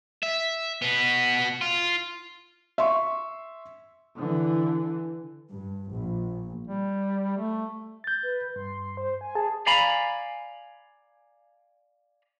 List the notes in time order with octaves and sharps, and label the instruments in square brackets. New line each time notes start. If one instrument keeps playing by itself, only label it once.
[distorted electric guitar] E5
B2 B3
F4
[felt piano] E5 C6 C#6
[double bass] D3 E3
[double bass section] G2
A#1
[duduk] G3
A3
[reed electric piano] G6 A6
[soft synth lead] B4
[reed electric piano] G2 [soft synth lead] C6
[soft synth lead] C5
G#5
[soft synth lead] G#4 [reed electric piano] A5
[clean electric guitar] D5 F5 G#5 A#5 B5